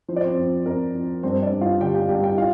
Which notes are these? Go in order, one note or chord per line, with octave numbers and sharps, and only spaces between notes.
F3 C5
D5
C4 C5
F2
F2 A#4
F2
G2 C4 C5
D4 D5
G2
F4 F5
D3 G4 G5
G4 G5
G2 G4 G5
G4 G5
F4 F5